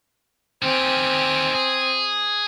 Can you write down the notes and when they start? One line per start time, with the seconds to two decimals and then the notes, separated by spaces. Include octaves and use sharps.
0.63 D#3 C4 G4 G#5
1.54 G#4